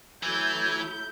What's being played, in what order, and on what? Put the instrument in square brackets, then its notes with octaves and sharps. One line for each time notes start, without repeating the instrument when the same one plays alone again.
[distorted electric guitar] E3 [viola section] F#3 A3 E4 [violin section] G6 [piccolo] G#6